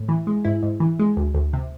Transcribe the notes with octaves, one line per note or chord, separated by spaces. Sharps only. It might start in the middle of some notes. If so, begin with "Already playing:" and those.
Already playing: A2
E3
G#3
G#2 E4
G#2
E3
G#3
D2
D2
C3